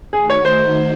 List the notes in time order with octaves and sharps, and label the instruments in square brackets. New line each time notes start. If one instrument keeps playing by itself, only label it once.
[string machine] D#3 A3 D#4 F#4 [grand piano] G#4
[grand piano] C#5
C5